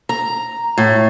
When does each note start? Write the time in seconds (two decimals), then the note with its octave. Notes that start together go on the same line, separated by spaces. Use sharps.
0.09 A#5
0.78 A2